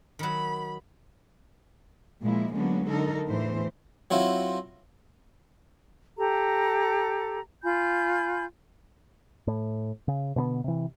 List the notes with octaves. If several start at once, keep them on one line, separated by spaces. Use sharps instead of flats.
D#3 F#3 B5
A#2 F3 G#3 A#3 E4
D3 F#3 G#3 A#3 B3 C#4
D3 D#4 A4 A#4
E2 A2 E3 C5
F#3 C4 E4 F4
G4 A4 A#5
F4 G#5 B5 G6
A2
C#3
B2 D3 A#3 B3
C3 E3